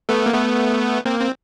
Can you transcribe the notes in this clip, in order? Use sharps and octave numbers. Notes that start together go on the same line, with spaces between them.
A3 B3
A#3
A3 B3
A#3 C4
C4